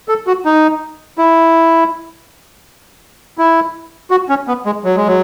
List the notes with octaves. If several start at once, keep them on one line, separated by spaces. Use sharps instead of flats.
A4
F#4
D#4
E4
E4
F#4
C#4
B3
G#3
F#3
G#3
F#3